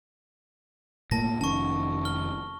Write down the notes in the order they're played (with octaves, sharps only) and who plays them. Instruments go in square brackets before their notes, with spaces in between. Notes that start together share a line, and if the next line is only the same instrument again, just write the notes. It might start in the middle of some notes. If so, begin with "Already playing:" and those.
[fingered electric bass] A2 A3 A#3 [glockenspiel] A5 A#6
[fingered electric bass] F1 D#3 C#4 [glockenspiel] A5 C#6
[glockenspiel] F6 G7